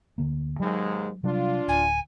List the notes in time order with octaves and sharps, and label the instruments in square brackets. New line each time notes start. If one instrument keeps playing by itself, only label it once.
[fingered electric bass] D2 D3 A#3
[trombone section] D#2 G#2 G#3 [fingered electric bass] F#3
[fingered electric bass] C3 F#3 G3 [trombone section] D4 F4
[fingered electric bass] D1 [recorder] G#5